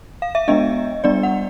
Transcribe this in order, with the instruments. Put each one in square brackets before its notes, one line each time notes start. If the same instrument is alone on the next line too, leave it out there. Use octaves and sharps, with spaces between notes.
[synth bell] F5
E5
G#3 B3 D4 D#5
G3 B3 D4 D5
F#5